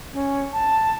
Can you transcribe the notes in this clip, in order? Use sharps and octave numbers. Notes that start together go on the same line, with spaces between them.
C#4
A5